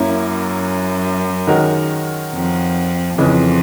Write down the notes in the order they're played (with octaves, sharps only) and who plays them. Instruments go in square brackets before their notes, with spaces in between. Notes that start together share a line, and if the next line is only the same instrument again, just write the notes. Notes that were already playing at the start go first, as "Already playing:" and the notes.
Already playing: [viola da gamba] F#2 [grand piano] A#3 C#4 E4
[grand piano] D#3 G#3 C#4 F#4 A#4
[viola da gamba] F2
[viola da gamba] F2 [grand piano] C#3 E3 G#3